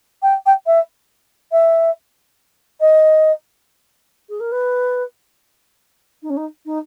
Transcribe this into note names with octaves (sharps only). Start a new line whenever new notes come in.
G5
G5
E5
E5
D#5
G#4
A#4
B4
D#4
C#4
D#4
D#4